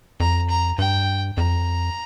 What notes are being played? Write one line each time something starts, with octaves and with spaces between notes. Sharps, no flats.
F2 A#5
A#5
G2 G5
F2 A#5